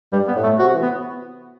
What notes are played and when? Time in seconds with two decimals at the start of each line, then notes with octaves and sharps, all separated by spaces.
0.12 G2 G3
0.28 B3
0.36 A2
0.43 A3
0.59 C3 F#4
0.75 E3
0.82 B3